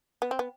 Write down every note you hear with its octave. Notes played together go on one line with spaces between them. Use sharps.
B3
C4
B3